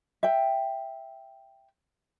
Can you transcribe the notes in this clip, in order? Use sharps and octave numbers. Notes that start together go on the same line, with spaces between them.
E5 G5